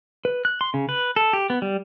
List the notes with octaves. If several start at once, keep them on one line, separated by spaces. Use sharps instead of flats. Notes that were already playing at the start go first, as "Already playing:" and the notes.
B4
F#6
C6
C#3
B4
A4
G4
B3
G3